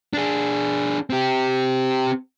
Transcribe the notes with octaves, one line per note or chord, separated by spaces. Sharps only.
D4 G#4
C4 G4